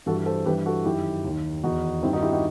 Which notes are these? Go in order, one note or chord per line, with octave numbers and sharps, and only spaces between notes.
G2 E3 F#4 A4
A4 C5
G2 E3 G4 B4
F#4 A4
F#2 D#3 E4 G4
D#2 D#3
E2 D#3 D#4 F#4
G2 D#3 C4 E4
D#4 F#4
E4 G4
D#4 F#4